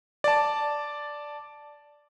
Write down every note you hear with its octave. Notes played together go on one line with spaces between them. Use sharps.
D5 A5